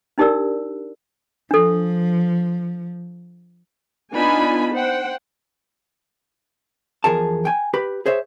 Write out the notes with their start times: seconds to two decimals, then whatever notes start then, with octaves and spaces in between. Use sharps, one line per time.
0.18 D4 D#4 G4 A#4 D5 E6
1.51 F3 D4 A4
4.13 B3 D4 D#4 F4 G#5 B5
4.73 C5 F#5 G5
7.04 E2 F3 G#4 A#4 A5
7.45 G5 G#5
7.74 G4 B4 B5
8.06 G#4 C5 C#5 E5